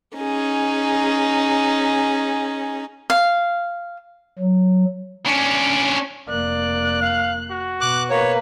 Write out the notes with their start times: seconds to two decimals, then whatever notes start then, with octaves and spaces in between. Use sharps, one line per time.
0.17 C#4 D#4 G#4
3.10 F5
4.39 F#3
5.26 C#4 D4
6.29 F1 A#3 D5 F#6
7.02 F5
7.51 F#4
7.81 B2 B3 D6 F#6
8.10 A#3 B4 C#5